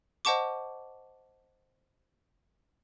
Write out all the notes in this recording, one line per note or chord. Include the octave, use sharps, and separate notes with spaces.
C5 D#5 F#5 A5 C#6 D6